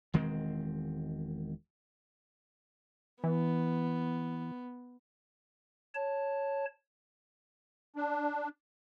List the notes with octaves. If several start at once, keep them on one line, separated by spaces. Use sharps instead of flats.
E1 D#3 G#3 C4
E3 B3
C#5 A5
D4